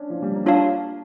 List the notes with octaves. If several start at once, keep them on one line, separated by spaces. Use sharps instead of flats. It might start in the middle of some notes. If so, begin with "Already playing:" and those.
Already playing: C#4 D4
F3
G3
A#3
D4 F4 C#5 F5 A5